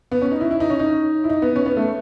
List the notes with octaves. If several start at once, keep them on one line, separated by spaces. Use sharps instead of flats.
B3
C#4
D#4
E4
E4
D#4
C#4
D#4
E4
D#4
B3
C#4
B3
A3